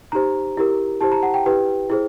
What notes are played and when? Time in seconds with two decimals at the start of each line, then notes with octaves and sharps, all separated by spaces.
0.12 D#4 G4 C5 A#5
0.57 E4 G4 A#4
1.01 E4 G4 C5 A5
1.12 A#5
1.23 F#5
1.34 G5
1.46 E4 G4 B4
1.90 E4 G#4 C5